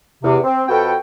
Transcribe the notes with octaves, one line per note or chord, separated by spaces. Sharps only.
E2 C3
C4
F2 F#4 A4 B4 G5